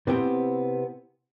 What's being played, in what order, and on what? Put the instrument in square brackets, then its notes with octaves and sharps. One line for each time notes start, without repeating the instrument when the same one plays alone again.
[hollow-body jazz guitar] C3 B3 C4 E4 G5